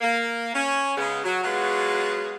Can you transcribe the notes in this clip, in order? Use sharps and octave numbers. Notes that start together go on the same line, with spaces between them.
A#3
C#4
C#3 G#3 B3
F#3
F#3 G#3 B3 F4 F#4 B4